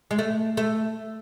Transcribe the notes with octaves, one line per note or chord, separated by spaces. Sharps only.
G#3
A3
A3